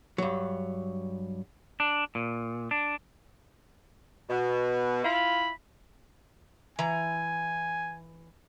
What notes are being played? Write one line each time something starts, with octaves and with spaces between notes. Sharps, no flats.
G2 F#3
D4
A#2
D4
B2
E4 F4 B5
E3 G#5 A#5